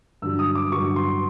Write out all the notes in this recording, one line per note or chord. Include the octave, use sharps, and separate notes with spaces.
G2 D3 F#3 E6
D#6
D6
G2 D3 F#3 C#6
C6